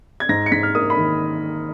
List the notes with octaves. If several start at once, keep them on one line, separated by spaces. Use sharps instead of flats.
G#6
G#2 A#6
C#7
G#2 B6
F6
A#3 D#6
B5
D#3